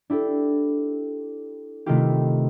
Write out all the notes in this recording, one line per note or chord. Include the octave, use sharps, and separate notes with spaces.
D4 E4 G4 A4
C3 D#3 A3 E4 F4 G4